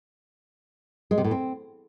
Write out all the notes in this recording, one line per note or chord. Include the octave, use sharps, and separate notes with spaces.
G#3
C3
A2
C4